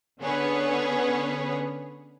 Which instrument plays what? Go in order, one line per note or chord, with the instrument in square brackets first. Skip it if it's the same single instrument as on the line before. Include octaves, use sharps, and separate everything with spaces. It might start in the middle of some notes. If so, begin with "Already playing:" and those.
[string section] D3 B3 C#4 G#4 B4 C#5